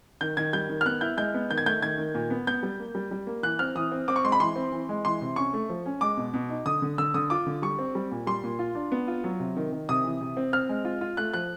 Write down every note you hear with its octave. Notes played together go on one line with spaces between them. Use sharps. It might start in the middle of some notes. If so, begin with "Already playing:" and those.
D#3 G6
D#3 G#6
G3 G6
D#3
F6
B3 F#6
E4 G6
G#3 G6
B3
D#3 G6
G#6
A3 G6
D#3 G#6
D#3
A#2
B3
B3 G6
G3
A#3
G3
G3
A#3
E3 F#6
C4 F6
E3 D#6
C4
C4 D6
C#6
G#3 C6
B5
E3 C6
C4
E3
G#3
E3 C6
C3
C#4 C#6
A3
F3
C#4
G#3 D6
B2
B2
D#4
D3 D#6
D3
D3 E6
D3 D#6
F4 D6
D3
G3 C#6
C4
G3
A#2
G3 C6
A#2
F4
D4
B3
F4
F#3
C3
D#3
D#3
C3 D#6
E3
C3
C4
C4 F6
G#3
F4
F4
A3 F#6
F3 F#6